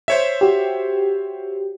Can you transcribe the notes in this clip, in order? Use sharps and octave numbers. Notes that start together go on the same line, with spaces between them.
C5 C#5 E5
F#4 G4